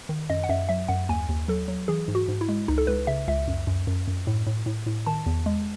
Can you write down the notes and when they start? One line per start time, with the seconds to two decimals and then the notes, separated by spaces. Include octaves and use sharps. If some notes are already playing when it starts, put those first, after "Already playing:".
0.09 D#3
0.30 F#2 D#5
0.44 F#5
0.49 F#2 E5
0.69 F#3 E5
0.88 F#2 F#5
1.09 D#2 G#5
1.29 D#2
1.48 F#3 A4
1.68 F#3
1.88 E3 G#4
2.08 G#2
2.15 F#4
2.28 G#2
2.41 E4
2.49 G#3
2.68 C#2 D#4
2.78 A4
2.87 C#2 B4
3.07 C#3 E5
3.28 C#2 E5
3.48 F#2
3.67 F#2
3.87 F#2
4.08 F#2
4.27 A2
4.47 A2
4.66 A2
4.86 A2
5.06 D#3 A5
5.26 E2
5.46 G#3